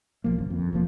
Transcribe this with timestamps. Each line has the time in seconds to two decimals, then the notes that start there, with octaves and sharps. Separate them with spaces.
0.24 B1 F3 A#3
0.38 G1 F#2
0.50 F2
0.73 E1 F3 A#3